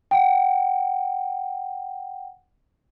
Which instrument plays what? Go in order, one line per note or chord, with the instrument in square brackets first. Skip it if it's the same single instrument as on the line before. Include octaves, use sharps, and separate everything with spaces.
[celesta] F#5 G5